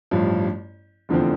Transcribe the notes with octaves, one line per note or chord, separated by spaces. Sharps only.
A1 G2 F3
F1 E2 D3 F3 C4